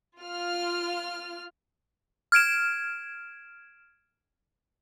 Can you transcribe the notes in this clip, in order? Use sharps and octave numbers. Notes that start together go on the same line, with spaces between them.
F4 F6
F6 G#6 D7 E7